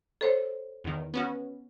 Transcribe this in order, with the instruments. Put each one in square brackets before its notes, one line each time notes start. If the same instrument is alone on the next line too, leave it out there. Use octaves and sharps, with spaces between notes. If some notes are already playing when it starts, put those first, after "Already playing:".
[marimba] A4 C5 C#5
[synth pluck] E2 D#3
B3 C#4 F#4